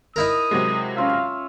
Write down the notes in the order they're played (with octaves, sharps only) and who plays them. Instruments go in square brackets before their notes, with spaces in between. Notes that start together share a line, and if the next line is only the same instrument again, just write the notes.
[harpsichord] D#4 E4 A#4 [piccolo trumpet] D#6
[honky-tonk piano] C3 F#3 G#3
[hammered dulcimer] C#4 F4 E5 [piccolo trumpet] F5